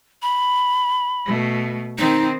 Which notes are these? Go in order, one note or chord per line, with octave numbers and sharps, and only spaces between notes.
B5
B2 A3
D#3 C4 D#4